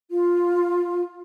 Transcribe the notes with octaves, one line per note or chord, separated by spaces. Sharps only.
F4